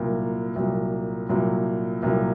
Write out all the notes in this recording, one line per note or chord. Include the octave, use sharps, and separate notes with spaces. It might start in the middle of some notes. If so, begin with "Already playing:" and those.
Already playing: C2 A#2 F#3 A#4
C2 A#2 F#3
C2 A#2 F#3
C2 A#2 F#3